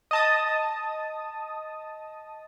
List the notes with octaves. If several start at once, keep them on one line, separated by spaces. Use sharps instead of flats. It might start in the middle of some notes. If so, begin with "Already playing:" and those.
D#5 A5 D#6